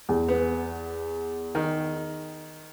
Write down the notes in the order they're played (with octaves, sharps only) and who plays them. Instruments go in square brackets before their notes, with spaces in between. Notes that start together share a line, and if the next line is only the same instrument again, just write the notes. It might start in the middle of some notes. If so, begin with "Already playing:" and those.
[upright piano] E2
[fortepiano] B3
D#3